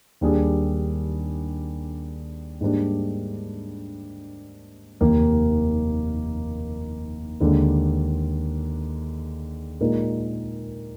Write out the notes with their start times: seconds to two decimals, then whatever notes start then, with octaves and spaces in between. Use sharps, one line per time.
0.21 D#2 D#3 G3 D4 G#4
2.61 G#2 G3 A#3 D4
5.01 F1 D#2 D#3 A#3
7.40 D#2 D3 G#3
9.80 A#2 G#3 D#4 A#4